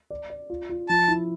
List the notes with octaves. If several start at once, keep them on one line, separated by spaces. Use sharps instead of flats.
D5
D5
F4
F4
F3 A5
E4